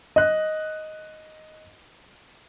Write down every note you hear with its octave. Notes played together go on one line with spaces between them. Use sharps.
D#5 F#6